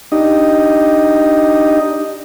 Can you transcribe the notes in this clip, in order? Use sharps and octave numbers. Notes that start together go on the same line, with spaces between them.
D4 D#4 G4 D#5